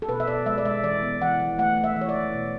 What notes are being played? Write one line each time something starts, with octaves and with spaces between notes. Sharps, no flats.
A4
B2 B4
E5
B2 D5
G#3 E5
D5
G#3 E5
E3 D5
B3
E3 F#5
E3
A3 F#5
A3
E5
E3
C#5
D5
E3
B2